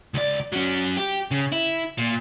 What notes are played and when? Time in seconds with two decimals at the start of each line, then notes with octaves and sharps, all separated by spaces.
0.14 C#2 D5
0.53 F#3 C#4
0.97 G4
1.31 C#3
1.52 E4
1.98 A#2